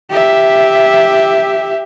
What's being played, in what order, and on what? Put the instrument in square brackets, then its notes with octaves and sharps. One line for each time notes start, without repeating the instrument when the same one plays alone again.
[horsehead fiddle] G4 E5